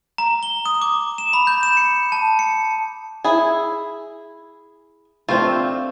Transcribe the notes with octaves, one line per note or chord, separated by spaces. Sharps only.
A#5
G7
D#6
D6
E7
B5
G6
E7
C#7
A5
C#7
E4 G#4
A3 C4 D4 F4